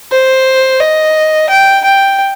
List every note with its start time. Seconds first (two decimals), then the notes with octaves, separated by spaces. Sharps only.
0.12 C5
0.80 D#5
1.50 G5
1.85 G5